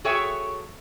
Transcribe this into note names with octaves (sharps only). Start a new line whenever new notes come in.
F#4 G#4 A4 C#5 E5 G5